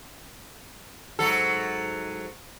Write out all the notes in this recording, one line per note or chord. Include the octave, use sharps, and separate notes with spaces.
G#2 F#3 A4